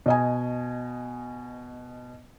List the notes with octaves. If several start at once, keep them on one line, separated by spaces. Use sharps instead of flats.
B2 D#5 G#5